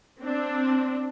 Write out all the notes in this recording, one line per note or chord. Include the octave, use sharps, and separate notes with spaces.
C4 D4